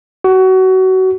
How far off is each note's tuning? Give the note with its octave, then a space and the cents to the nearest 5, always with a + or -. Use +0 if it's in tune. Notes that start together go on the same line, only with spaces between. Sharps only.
F#4 +25